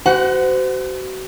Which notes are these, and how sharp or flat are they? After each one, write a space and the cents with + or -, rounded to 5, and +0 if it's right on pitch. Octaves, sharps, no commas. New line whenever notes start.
F#4 +35 C5 -35 F#5 +0